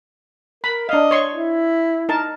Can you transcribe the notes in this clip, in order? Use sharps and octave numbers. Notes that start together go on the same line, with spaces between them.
A#4 B5
D4 D#5 F5
C#5 C6 C#6
E4
D#4 A#4 A5